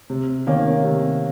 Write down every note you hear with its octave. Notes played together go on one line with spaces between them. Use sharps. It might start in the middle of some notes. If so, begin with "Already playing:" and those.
C3
D#3 A#3 C#4
C3